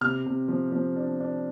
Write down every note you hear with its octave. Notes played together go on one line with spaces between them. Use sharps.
C3 F6
C3
F3
F3
D4
D4